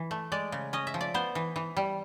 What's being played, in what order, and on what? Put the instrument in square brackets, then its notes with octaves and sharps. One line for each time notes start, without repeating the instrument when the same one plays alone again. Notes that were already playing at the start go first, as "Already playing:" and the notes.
Already playing: [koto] E3
A3
G#3 D5
C#3
C#4 D#5
E5
F3
D5
B3 C5
E3
E3
G3